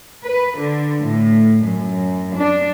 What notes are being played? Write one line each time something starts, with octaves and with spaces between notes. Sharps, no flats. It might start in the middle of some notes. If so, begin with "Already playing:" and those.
B4
D3
A2
F#2
D4